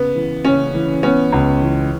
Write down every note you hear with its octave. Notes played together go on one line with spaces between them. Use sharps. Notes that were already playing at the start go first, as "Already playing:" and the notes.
Already playing: C#3 B3
E3
C#3 C#4
E3
B3 C#4
C#2
E3